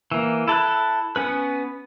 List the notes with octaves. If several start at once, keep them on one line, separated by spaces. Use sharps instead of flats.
E3 A#3
E4 A4 B5 F#6
B3 C#4 B4